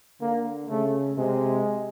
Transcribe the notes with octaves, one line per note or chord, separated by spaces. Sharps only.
D3 A#3
C#3 A3
C3 G#3